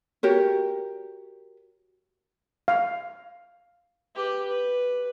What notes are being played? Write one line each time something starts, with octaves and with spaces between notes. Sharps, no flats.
F#4 G4 A#4 C#5
F5
G4 B4
B4